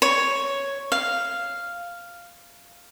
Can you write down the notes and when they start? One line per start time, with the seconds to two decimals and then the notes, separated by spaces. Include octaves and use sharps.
0.02 C#5
0.92 F5